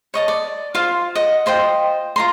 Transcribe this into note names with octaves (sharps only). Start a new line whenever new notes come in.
C#5 D#5 A5
D5
F4 C5 F5
D#5 F#5
F4 C5 D#5 G5
F4 A#5 C6